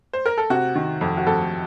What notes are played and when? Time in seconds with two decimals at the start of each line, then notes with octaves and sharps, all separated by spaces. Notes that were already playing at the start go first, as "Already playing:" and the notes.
0.13 C5
0.26 A#4
0.38 A4
0.50 C3 F#4
0.75 D#3
1.01 F2
1.17 F#4
1.27 F2 A4